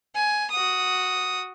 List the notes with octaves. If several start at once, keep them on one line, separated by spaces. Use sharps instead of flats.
G#5
F#4 D#6